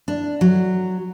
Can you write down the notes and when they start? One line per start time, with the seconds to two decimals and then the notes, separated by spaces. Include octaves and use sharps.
0.08 D4
0.41 F#3